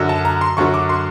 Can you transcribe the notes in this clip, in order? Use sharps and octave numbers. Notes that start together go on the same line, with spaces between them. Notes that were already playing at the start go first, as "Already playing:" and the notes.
Already playing: F#2 D3 F#3
A5
A#5
C6
F#2 D3 F#3 C#6
D6
C6